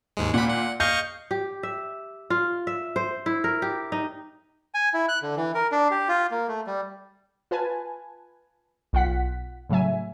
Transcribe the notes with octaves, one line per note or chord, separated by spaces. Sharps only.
D#2 G#2 G#3
A#2 F#5 B5
F#5
D#5 F5 C#6 G6
G4
E5
F4
E5
C5
E4
A#4
G4
D#4
G#5
E4
F#6
D3
E3
A#4
D4
G4
F4
A#3
A3
G3
F4 B4 G#5 A5
B1 F4 F#5 B6
A2 C#3 F#3 E5 G#5